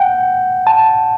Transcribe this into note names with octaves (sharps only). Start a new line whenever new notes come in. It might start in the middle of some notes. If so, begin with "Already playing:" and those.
Already playing: F#5 G5
A5